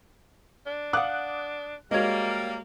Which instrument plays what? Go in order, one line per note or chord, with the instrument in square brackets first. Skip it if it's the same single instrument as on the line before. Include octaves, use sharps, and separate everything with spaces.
[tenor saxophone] D4
[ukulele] F5 F#5 [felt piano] D6 D#6 F#6
[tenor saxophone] G3 [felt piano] G#3 F#4 [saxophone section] A#3 [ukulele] C#5 D#5